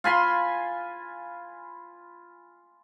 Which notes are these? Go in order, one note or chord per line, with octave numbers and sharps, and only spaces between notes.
F4 G#5 B5 C6